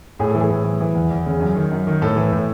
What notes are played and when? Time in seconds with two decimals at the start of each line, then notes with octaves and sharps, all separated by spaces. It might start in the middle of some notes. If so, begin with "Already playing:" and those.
0.19 A2 G#4
0.30 E3 A4
0.40 G#4
0.50 A2
0.64 E3
0.81 E3
0.95 E2
1.11 E2
1.26 C#3
1.40 F#2
1.55 D#3
1.71 F#2
1.87 D#3
2.02 A2 A4
2.16 E3
2.32 A2